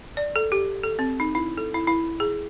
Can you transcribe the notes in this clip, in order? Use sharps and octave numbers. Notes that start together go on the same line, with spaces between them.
D5
A4
G4
A4
C4
D#4
E4
A4
E4
E4
G#4